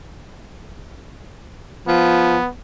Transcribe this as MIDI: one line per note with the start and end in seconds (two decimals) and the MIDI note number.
1.88 2.37 53
1.88 2.48 59